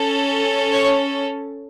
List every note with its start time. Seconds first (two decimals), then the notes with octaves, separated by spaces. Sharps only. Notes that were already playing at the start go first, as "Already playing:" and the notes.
Already playing: C#4 A4
0.72 C#5